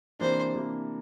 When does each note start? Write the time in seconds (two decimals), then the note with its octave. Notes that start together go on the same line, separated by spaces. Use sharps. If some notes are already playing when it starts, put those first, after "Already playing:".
0.19 C3 E3 A#3 D4 C5
0.55 C3 E3 A#3 D4